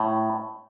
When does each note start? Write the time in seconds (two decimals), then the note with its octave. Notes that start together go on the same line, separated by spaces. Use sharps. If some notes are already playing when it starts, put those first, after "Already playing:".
Already playing: A2